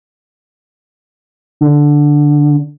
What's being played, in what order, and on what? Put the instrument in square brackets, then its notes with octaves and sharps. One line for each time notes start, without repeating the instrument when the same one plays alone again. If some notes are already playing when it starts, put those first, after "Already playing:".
[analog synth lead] D3